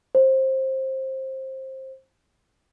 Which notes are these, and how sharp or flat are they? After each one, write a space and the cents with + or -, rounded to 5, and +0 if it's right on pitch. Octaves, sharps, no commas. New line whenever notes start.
C5 +20